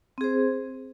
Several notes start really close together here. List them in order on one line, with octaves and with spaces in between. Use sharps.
C4 G#4 C5